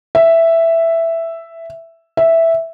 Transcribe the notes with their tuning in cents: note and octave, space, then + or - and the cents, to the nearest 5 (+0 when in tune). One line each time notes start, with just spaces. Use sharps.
E5 +5
E5 +0